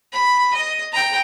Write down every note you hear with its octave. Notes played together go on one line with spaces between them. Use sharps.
B5
D#5
G5 A#5